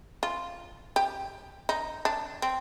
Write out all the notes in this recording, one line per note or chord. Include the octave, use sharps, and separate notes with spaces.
F4
G4
D#4
D4
C4